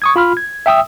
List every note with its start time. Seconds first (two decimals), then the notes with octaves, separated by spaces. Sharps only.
0.02 C#6 D#6 G#6
0.16 F4 B5 F6
0.37 G#6
0.66 E5 G5 D#6 E6